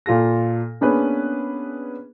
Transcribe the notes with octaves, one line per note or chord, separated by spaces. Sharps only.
A#2 F4 A4 A#6
A#3 B3 C#4 D4 G#4 B4